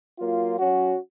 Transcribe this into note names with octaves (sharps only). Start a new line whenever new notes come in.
F#3 A#3 F4
F#3 C#4 F#4